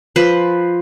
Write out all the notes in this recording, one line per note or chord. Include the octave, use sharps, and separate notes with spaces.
F3 B4 C5